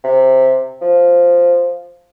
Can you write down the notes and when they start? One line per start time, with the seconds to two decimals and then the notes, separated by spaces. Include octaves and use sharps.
0.04 C3
0.81 F3